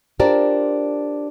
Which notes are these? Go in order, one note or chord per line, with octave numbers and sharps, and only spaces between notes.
D4 F4 G4 A#4 C5 D5